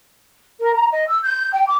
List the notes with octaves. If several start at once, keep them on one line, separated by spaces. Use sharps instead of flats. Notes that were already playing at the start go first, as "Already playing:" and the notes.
A#4
A#5
D#5
E6
G6
G5
D6